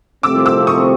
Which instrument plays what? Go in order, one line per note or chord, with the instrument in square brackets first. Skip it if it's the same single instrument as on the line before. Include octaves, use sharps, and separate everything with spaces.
[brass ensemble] C2 C3 F3 A3 C4 [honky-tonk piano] D6 E6
[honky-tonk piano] D6 E6
C#6 D#6